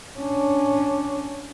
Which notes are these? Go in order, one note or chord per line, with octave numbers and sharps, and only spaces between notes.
C#4 D4